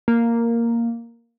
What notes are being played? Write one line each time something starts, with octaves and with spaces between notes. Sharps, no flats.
A#3